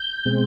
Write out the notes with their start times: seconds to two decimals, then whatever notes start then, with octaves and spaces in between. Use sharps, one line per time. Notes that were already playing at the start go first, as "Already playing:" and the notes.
Already playing: G6
0.25 B2 G#3 C4